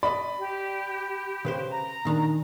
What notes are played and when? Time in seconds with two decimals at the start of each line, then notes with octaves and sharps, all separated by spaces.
0.03 D5 D#5 B5
0.39 G4
1.45 C#3 B4 C5
1.68 A#5
2.05 A#2 D#3 D4